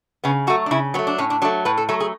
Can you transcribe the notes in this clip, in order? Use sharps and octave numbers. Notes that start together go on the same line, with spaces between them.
C#3 B3
F#3 A3 F#4
D4
C#3 E4
F#3 A3 B3
D4
A2 C#4
D4
F#3 A3 D4
A2 B4
A4
F#3 A3 A4
G#4